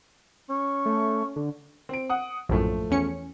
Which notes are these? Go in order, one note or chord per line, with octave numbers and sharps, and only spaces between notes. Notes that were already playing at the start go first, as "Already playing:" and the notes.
C#4 C#6
A3
D3
C4 D7
F#5 D#6
A#1 F#2 A2 F3 A3
E2 C#4 C#7